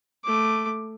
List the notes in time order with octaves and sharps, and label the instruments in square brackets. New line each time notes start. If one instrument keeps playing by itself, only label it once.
[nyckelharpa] A3 D6